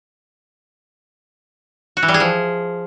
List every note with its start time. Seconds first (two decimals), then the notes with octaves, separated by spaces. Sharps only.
1.97 F#4
2.03 E3
2.08 G3
2.14 G#4
2.20 F3